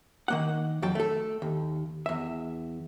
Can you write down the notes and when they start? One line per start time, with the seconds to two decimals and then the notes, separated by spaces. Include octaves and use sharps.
0.28 D#3 A#3 F#5
0.82 F2 F#3 G5 A5
0.95 A3 A4
1.42 D#2
2.06 E2 E5